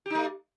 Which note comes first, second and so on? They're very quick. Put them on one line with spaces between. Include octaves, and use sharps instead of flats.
G4 D#4 A3